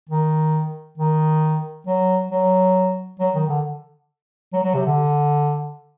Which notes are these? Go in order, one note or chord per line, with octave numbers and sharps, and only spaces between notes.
D#3
D#3
F#3
F#3
F#3
D#3
D3
F#3
F#3
C3
D3